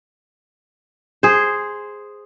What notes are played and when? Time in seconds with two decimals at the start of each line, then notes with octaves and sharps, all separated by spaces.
1.23 G#4 C5